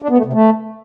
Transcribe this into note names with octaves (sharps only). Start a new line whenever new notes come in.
D4
B3
A3
C3
A3